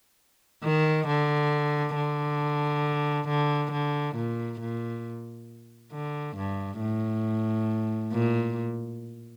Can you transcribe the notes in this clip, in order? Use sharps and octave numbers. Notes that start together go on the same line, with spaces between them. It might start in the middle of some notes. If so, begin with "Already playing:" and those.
D#3
D3
D3
D3
D3
A#2
A#2
D3
G2
A2
A#2